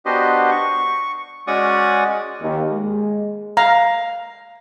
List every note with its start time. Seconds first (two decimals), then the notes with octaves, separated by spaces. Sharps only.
0.06 B3 D4 F#4 G4 C5 D#5
0.51 C#6
1.47 G#3 C#4 F#4 D5 C#6 D#6
2.41 D#2
2.72 G#3
3.57 F5 A#5